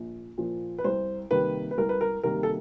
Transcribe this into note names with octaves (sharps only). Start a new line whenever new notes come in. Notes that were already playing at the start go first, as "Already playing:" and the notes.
Already playing: A#1
A#2 F3
B4
C2 C5
C3 D#3 G3 A#3 B4
B4
C2 A#4
B4
A#4
C3 D#3 G3 A#3 A#4
A4